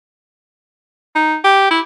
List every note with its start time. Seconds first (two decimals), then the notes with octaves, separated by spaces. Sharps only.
1.16 D#4
1.44 G4
1.71 E4